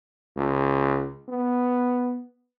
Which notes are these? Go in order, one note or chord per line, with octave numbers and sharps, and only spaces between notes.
C#2
B3